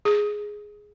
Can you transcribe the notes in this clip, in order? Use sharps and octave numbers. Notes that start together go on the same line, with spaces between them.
G#4